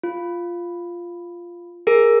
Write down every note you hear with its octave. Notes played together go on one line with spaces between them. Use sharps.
F4
G#4 A#4